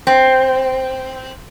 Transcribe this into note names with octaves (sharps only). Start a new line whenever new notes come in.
C4